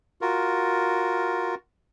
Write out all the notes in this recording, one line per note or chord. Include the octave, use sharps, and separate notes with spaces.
F4 F#4 A#4